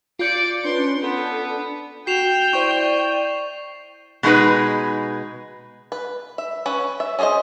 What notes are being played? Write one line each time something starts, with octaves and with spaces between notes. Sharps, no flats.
F4 D5 D6 G6 C#7
C#4 D4 B4 C6
B3 D4 A4
F#4 G5 C7 E7 F7
E4 C5 D5 E5 C#6
B2 G#3 A3 D#4 G#4 B4
B4
E5
C#4 B4 C#5
E5
C#4 G#4 A#4 C5 D#5